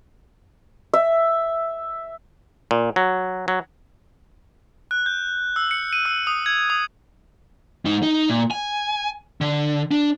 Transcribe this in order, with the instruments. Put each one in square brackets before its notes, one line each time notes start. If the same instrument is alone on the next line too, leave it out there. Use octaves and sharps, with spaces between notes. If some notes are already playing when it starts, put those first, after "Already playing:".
[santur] E5
[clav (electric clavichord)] A#2
F#3
F#3
[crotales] F#6
G6
E6
C#7
D#7
E6
D#6
G#6
D#6
[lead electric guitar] G#2 D#4
D#4
A#2
G#5
D3
D4